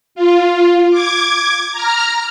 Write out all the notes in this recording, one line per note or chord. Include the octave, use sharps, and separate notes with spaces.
F4
D6 G#6
A#5 F6